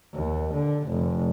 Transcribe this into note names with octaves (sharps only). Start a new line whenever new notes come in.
D#2
D3
F1